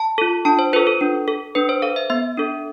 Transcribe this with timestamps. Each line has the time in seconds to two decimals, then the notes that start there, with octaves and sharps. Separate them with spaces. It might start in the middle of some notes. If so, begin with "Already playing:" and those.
Already playing: A5
0.18 F4 A4
0.45 D4 A5
0.59 C5
0.73 F4 A4 B4
0.87 A4
1.01 D4
1.28 A4
1.55 D4 B4
1.69 C5
1.82 A4 F5
1.96 E5
2.10 B3 E5
2.37 D4 A4